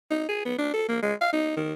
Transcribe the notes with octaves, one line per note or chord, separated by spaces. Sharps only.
D#4
G#4
B3
D4
A4
A#3
G#3
F5
D#4
D#3